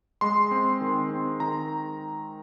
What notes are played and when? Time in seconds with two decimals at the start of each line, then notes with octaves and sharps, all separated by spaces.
0.21 G#3 C6
0.51 C4
0.81 D#3
1.11 C4
1.40 D#3 A#5